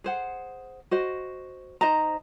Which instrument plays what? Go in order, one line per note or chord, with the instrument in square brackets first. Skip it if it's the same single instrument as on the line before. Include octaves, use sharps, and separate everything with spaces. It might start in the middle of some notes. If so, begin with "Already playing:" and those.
[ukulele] G#4 C5 F#5
F#4 C5 D#5
D#4 C5 D#5 A#5